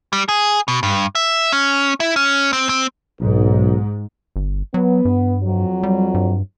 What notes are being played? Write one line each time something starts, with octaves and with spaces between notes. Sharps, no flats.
G3
G#4
B2
G2
E5
C#4
E4
C#4
C4
C4
B1 G#2
G1
F#3 B3
G2
F2 F#3
G3
G2